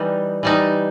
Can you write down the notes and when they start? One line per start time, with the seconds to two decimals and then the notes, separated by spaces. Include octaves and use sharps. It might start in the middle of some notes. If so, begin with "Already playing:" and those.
Already playing: E3 G3 D#4
0.43 E3 G3 D#4